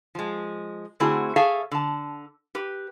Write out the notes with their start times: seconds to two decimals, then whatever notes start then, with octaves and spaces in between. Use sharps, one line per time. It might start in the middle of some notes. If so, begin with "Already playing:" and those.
0.15 F3 G#3
1.00 D3 A3 C4 E4 F#4 G#4
1.36 G#4 A4 C#5 E5 F5
1.71 D3 A5
2.55 G4 B4